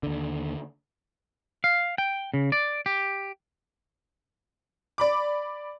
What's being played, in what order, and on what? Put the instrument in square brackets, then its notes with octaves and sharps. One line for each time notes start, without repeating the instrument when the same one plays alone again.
[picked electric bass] D#2 D3
[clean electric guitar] F5
G5
C#3
D5
G4
[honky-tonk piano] D5 B5 D6